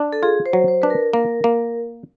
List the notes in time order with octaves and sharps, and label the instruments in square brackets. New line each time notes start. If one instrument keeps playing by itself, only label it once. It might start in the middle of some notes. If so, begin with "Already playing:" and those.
Already playing: [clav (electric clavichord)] D4
[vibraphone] A4
[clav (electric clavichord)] F4 [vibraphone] G#4
[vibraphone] C5
[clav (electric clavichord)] F#3
[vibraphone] C5
[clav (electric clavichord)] D4 [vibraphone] B4
[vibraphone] A#4
[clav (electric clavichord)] A#3 [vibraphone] A#4
[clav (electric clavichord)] A#3